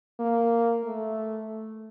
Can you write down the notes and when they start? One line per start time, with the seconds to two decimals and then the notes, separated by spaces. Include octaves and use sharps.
0.20 A#3
0.84 A3